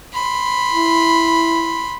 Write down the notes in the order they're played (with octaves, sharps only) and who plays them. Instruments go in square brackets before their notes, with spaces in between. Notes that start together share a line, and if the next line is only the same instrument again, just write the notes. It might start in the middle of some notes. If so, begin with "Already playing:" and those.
[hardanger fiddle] B5 C6
[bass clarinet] E4